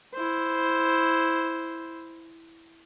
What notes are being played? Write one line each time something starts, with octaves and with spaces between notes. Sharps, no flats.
E4 C5